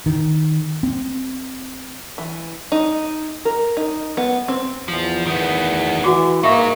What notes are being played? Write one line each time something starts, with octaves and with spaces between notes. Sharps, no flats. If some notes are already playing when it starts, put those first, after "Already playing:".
D#3
C4
E3
D#4
A#4
D#4
B3
C4
E2 F3
E2 D#3 B3
E3 F#4 F#5 D6
G#3 A#3 D#4 A#4 E5 C#6